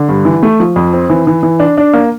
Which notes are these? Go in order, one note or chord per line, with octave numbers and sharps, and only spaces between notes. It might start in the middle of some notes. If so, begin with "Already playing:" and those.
Already playing: D3
G2
E3
A3
F3
F2
C4
E3
E3
E3
D4
D4
A#3